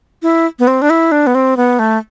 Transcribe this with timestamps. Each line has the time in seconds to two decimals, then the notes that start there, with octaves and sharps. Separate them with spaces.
0.23 E4
0.59 B3
0.67 C4
0.82 D4
0.90 E4
1.12 D4
1.27 B3
1.35 C4
1.57 B3
1.79 A3